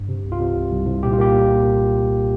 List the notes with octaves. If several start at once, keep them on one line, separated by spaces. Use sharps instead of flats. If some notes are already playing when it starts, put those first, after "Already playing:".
Already playing: G2
C3
C2
F4
C3
C2
C2
C2
A#2 G4
F4
A#3 G4
A#2